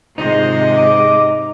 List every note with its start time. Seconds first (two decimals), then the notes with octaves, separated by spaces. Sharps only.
0.18 G#2 C3 D#3 G#3 D#4 F4 C5 D#5
0.77 D6